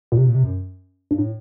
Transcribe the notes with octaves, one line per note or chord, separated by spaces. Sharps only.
A#2
C3
A#2
C3
F#2
G2
A2